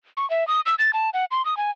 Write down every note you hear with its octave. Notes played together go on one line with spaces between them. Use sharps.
C#6
E5
D#6
E6
A6
A5
F#5
C6
D#6
G#5